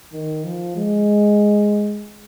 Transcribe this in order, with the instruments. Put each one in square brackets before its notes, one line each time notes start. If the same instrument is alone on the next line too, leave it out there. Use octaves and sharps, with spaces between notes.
[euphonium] D#3
F3
G#3